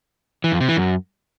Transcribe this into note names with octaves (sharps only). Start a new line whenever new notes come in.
E3
F2
C3
E3
F#2